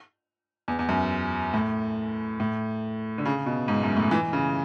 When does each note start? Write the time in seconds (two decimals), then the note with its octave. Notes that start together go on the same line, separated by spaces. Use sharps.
0.68 E2
0.79 E2
0.89 F#2
1.53 A2
2.40 A2
3.18 D3
3.25 C#3
3.46 B2
3.68 G#2
3.83 F#2
3.97 A2
4.11 E3
4.33 C#3